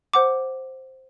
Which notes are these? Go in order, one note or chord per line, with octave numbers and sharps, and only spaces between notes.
C5 F#5 D6